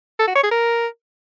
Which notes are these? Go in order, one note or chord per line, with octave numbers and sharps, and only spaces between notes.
A4
F#4
C#5
G#4
A#4